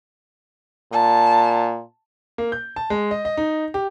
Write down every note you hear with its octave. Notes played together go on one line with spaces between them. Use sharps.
A#2 A5
A#3
G6
A5
G#3
D#5
D#5
D#4
G4